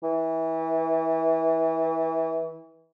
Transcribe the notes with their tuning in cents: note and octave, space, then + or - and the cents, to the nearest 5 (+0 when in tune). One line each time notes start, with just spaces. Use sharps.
E3 -25